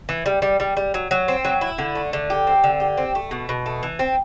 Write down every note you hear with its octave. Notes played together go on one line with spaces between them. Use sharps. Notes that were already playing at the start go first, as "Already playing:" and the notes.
E3
G3
G3
G3
G3
F#3
F#3
C4
F#3
E4
D3
A3
D3
G4
C4
D3
G4
C4
A3
B2
B2
A3
E3
C4